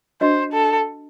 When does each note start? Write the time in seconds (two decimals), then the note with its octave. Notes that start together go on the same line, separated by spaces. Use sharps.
0.21 D4 F#4 B4 C5 D#5
0.53 A4